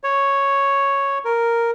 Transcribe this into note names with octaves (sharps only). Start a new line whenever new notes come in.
C#5
A#4